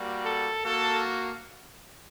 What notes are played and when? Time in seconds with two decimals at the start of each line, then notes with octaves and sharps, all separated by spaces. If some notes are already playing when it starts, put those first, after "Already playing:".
Already playing: G3 A#3 F#4
0.24 A4
0.64 A#3 F#4 A4